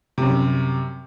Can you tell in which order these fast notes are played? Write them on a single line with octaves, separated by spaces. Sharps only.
C3 F#2 G3